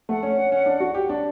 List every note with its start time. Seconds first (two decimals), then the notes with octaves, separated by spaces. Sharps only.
0.09 A3 F#5
0.23 C#4
0.37 C#4
0.52 C#4
0.66 D4
0.80 F#4
0.95 G4
1.09 D4